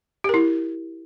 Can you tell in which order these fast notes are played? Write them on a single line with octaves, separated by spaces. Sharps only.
G4 A#4 E4